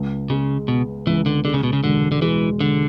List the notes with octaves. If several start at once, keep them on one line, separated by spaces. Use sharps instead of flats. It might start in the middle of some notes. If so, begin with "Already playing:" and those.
Already playing: C#2
C#3 G#3
B2 B3
C#2 E3
D3
D3 G#3
C#3
B2
C#3
E1 D3
D3
E3 G#3
E1 D3